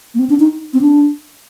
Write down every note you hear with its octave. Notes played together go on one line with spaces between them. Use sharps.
A#3
C4
D4
D#4
C4
D4